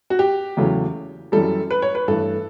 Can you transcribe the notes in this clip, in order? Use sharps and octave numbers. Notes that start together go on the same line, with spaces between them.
F#4
G4
E2 C#3 F#3 A3
F#2 E3 G3 A4
B4
C#5
B4
G2 E3 A3 A4